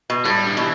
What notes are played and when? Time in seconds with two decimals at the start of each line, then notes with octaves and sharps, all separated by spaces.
0.10 B2
0.25 A2 G3
0.47 D3
0.57 B2 E3